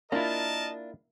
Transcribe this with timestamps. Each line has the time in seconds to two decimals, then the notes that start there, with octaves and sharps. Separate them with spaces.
0.12 A#3 D4 E4 F4 A#4 D#5 A5